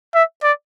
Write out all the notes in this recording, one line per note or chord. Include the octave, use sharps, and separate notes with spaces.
E5
D5